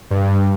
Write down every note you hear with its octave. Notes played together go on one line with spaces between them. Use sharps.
G2